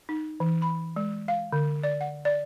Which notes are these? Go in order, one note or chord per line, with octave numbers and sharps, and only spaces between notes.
D#4
E3
B5
G#3
F5
D3
D5
F#5
D5